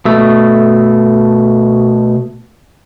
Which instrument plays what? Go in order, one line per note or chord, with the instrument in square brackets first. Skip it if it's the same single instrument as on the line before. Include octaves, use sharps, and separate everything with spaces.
[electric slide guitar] B2 A3